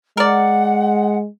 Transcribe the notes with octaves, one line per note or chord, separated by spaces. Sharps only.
G#3 A#4 D5 F#5